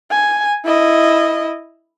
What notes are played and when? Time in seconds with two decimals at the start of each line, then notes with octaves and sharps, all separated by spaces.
0.11 G#5
0.66 E4 D#5